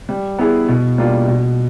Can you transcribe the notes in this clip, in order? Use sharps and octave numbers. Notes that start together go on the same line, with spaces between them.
G3
B3 E4 G#4
B2
G3 A#3 D4 F4
B2